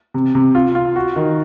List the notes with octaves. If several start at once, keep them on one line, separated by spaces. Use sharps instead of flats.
C3
C3
F4
F4
F#4
D#3